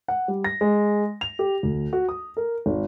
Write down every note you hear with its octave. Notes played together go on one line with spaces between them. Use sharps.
F#5
G3
A#6
G#3
F7
G4
D2
F#4
D#6
A#4
G#1